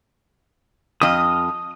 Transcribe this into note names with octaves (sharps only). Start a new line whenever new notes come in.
F2 D#5 D#6 F6